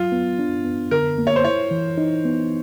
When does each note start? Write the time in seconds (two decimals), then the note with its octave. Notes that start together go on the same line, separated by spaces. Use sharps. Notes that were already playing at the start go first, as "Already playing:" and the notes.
Already playing: F#3 F4
0.12 B3
0.39 D4
0.65 B3
0.91 D3 A#4
1.18 A#3
1.27 C#5
1.36 C5
1.44 E4 C#5
1.71 E3
1.98 D#4
2.25 B3